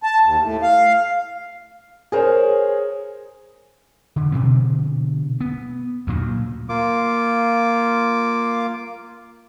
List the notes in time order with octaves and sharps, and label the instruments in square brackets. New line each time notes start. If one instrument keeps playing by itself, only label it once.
[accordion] A5
D#2
A2
F5
[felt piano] G#4 A#4 C5 C#5
[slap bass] D3
B2 D3 F3 C4
B3
D2 A#2 F#3
[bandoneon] A#3 F4 D6